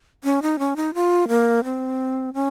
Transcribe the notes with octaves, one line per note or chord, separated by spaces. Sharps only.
C#4
D#4
C#4
D#4
F4
A#3
C4
C#4